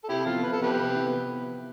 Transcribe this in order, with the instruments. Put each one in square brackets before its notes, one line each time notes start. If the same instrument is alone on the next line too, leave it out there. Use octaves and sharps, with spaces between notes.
[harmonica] A4
[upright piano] C3 [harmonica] E4 G4
[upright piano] F3 B3 E4 [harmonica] F4 A4
[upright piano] C3 [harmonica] B4
[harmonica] A4
[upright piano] F3 B3 E4 [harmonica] G4 B4
[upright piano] C3
F3 B3 E4